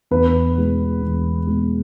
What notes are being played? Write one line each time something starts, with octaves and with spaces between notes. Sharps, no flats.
E2 B4
B2 G#3
E2
B2 G#3